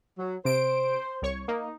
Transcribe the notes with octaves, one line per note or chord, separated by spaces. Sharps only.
F#3
C3 C5 D7
C2 C#5 C#6
A#3 D#4